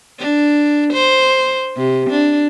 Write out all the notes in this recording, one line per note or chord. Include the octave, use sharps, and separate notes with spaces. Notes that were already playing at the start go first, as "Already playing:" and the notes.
D4
C5
C3
D4